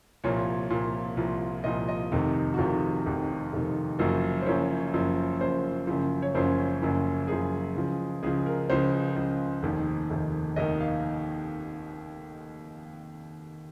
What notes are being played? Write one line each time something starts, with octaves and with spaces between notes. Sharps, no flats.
C2 A#2 F3 C#5
C2 A#2 F3
C2 A#2 F3
C2 A#2 F3 D#5
D#5
F1 F2 C3 D#3
F#4
F1 F2 C3 D#3 F4
F1 F2 C3 D#3
F1 F2 C3 D#3
F#1 F#2 F3 F#4
C5
F#1 F#2 F3 C#5
F#1 F#2 F3
F#1 F#2 F3 C5
F#1 F#2 C#3 F3
C#5
F#1 F#2 C#3 F3 C5
F#1 F#2 C#3 F3
F#1 F#2 C#3 F3 G#4
C#2 C#3 F3
C#2 C#3 F3 G#4
A#4
C#2 C#3 F3 C5
C#2 C#3 F3
F1 D#2 D#3
F1 D#2 D#3
F1 D#2 D#3 D#5
F5